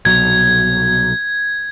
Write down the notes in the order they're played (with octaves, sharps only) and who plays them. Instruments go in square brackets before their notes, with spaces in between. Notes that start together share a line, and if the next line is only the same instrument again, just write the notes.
[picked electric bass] C2 B2 F#3 [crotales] G#6